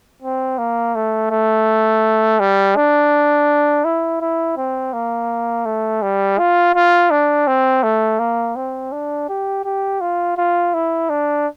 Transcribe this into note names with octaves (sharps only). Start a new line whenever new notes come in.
C4
A#3
A3
A3
G3
D4
E4
E4
C4
A#3
A3
G3
F4
F4
D4
C4
A3
A#3
C4
D4
G4
G4
F4
F4
E4
D4